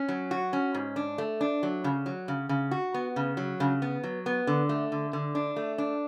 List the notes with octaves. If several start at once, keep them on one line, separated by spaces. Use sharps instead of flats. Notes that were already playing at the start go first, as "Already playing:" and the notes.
Already playing: C#4
F#3
F#4
C#4
G#2
D4
A3
D4
F#3
C#3
F#3
C#3
C#3
F#4
B3
C#3
F#3
C#3
B3
F#3
B3
D3
A3
D3
D3
D4
A3
D4